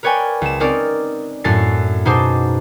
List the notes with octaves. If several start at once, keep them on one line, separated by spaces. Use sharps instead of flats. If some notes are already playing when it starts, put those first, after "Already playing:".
A#4 B4 C#5 D5 G5 G#5
C#2 E7
C4 C#4 D#4 A#4 D5
F#2 A2 A3 C#4 A6 C7
B2 D#4 G#4 C5 A5 D6